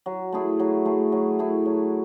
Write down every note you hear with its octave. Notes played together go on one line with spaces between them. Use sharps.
F#3
A3 E4 G#4
F#3
A3 E4 G#4
F#3
A3 E4 G#4
F#3